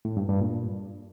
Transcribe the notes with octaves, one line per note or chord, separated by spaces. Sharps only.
A2
G2
G2
A#2